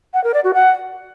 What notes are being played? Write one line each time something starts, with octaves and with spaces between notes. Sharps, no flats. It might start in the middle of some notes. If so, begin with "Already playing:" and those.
F#5
A#4
D5
F#4
F#5